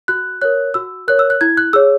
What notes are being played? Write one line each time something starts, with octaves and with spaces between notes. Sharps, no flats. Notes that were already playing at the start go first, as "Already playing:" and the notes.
F#4 F#6
A#4 C#5 F#6
F#4 E6
A#4 C#5 F#6
E6
F#6
E4 G#6
F#6
G#4 C#5 E6